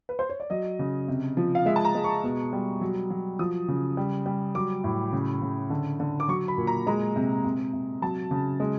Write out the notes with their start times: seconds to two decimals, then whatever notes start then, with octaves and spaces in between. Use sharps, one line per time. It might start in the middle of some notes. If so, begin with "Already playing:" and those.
0.09 B4
0.19 C5
0.30 C#5
0.40 D5
0.50 F#3 D#5
0.79 C#3
1.08 C3
1.37 F3
1.55 F5
1.66 G#3 E5
1.76 A5
1.85 A#5
1.95 G#3
2.04 C#6
2.24 B2
2.53 G3
2.81 F#3
3.10 F#3
3.39 F3 D#6
3.68 C#3
3.97 G3
4.26 G3
4.55 F#3 D6
4.84 A2
5.12 C#3
5.41 C#3
5.70 D3
6.00 D3
6.20 D6
6.28 F#3 C#6
6.48 B5
6.57 A#2
6.67 A#5
6.87 G#3 A#5
7.16 C3
7.45 C3
7.73 C3
8.02 F#3 A5
8.31 C#3
8.60 G#3